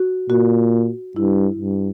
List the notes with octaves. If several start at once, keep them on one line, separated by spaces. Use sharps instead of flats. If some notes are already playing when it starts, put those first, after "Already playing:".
Already playing: F#4
A#2 F#4
G2 E4
G2